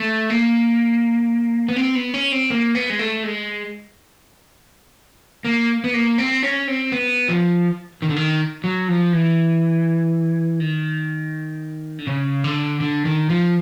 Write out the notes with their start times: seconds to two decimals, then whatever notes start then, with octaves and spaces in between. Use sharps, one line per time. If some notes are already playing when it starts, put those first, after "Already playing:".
Already playing: A3
0.30 A#3
1.69 B3
1.76 C4
1.95 B3
2.14 C#4
2.32 C4
2.50 A#3
2.75 B3
2.90 G#3
2.99 A3
3.24 G#3
5.45 A#3
5.84 B3
5.94 A#3
6.18 C4
6.43 C#4
6.68 C4
6.92 B3
7.28 F3
8.02 D#3
8.09 D3
8.16 D#3
8.64 F#3
8.88 F3
9.13 E3
10.60 D#3
11.98 D3
12.07 C#3
12.44 D3
12.80 D3
13.05 D#3
13.30 F3